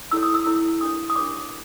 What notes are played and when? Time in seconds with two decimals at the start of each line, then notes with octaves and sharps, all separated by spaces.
0.11 E4 A4 C#5 E6
0.23 D#6
0.34 E6
0.46 E4 A4 C#5
0.81 D4 G4 A#4 C#5 D#6
1.10 D#6
1.16 D4 G4 A#4 C#5 D6